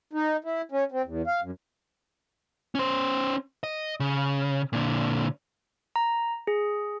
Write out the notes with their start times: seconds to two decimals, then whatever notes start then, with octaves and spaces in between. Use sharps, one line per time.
0.13 D#4
0.44 E4
0.72 C#4
0.92 C4
1.05 E2
1.27 F5
1.42 F#2
2.75 C#4 C5
3.64 D#5
4.00 C#3
4.73 A#2 D3
5.96 A#5
6.47 G#4